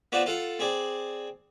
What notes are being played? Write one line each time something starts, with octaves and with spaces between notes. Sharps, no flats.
B3 F4 F#4 C5 D5
F4 A4 F5 F#5
C4 G#4 D5